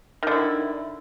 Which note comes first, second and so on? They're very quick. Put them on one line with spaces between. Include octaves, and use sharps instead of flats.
D#3 D3 E4